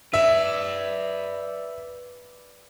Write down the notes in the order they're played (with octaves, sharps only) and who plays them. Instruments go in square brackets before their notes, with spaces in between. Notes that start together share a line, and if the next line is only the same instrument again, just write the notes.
[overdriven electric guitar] B4 D5 [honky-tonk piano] E5